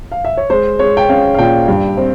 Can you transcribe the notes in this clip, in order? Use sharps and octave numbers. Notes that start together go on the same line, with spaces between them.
F5
E5
C#5
G#3 C5
G#3 C#5
G5
C#4 F5
F5
A#2 G5
G2
C4